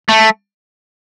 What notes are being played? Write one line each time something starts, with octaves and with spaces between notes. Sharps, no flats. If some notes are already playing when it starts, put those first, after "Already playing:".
A3